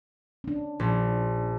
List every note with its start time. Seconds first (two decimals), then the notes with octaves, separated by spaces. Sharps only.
0.44 C#4 D4
0.80 A#1